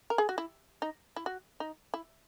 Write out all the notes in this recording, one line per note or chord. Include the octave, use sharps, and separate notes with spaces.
A#4
G#4
F#4
E4
D#4
E4
F#4
D#4
E4